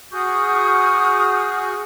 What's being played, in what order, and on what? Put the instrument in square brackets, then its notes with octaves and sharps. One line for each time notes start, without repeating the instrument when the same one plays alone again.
[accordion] F#4 G#4 [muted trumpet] C#6 [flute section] D#6 F6 G6